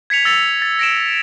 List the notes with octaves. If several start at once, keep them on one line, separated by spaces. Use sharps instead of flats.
G#6 B6 C#7 F7
E6 A6 C#7 F7
A6
A#6 D7 E7